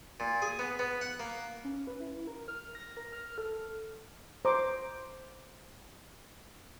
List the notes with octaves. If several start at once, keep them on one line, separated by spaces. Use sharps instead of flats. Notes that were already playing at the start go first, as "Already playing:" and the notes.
A#2
G#4
B3
B3
F#5
A#3
C#4
B4
E4
A#4
F6
A#6
A#4
F6
A4
C5 A#5 D6